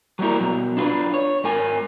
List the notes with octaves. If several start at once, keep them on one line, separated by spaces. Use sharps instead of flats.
F#3 G3 A#3 E4 A#4
B2 F#3
D4 E4 F4 B4
C#5
G#2 A#4 G#5